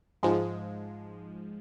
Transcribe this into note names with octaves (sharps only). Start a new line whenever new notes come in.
G#2 F3 G#3